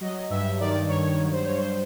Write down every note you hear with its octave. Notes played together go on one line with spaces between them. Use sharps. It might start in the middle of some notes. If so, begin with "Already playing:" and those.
F#3 D#5
G2 E5
D#3 D5
G2 C#5
F#3
C5
G2 C#5
C5